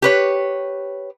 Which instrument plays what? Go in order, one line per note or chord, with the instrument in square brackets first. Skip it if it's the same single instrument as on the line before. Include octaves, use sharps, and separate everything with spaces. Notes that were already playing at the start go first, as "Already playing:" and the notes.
[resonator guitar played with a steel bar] G4 B4 C#5